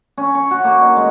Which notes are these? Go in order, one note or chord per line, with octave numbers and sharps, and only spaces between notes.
C#4
C#6
F#4
A#3
D#4
G#3